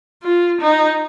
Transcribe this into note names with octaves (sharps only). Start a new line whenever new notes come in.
F4
D#4